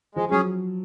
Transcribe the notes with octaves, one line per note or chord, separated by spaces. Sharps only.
F3 G#3
F#3 C#4 G#4